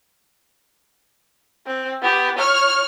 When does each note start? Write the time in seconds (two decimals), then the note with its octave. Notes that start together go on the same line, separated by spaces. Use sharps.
1.67 C4
2.02 B3 G4
2.38 C#5 F6